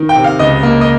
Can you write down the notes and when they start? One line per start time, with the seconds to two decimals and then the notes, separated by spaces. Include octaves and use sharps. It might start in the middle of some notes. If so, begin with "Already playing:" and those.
Already playing: D#3
0.09 G5
0.16 C3
0.24 F5
0.39 C#2 D#5
0.63 A#3
0.81 D#5